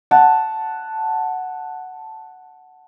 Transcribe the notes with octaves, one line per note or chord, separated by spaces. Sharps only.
F#5 A5